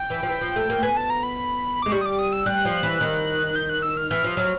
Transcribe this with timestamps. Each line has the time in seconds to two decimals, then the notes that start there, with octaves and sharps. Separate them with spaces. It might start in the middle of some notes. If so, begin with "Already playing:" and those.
Already playing: G5
0.10 E3
0.23 F3
0.29 E3
0.41 F3
0.56 A3
0.70 A#3
0.83 B3 G#5
0.97 A5
1.10 A#5
1.23 B5
1.82 G#3 D6
1.92 G3 C#6
2.01 D#6
2.06 D6
2.19 D#6
2.32 E6
2.46 G3 F#6
2.65 F3
2.83 E3
3.01 D#3
3.56 G6
3.69 F#6
3.82 E6
3.97 F6
4.10 E3 F6
4.24 F3
4.37 F#3